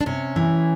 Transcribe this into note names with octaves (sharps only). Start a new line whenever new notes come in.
D4
C3 C#4
E3